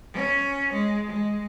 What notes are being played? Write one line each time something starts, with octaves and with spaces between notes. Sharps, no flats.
C#4
G#3
G#3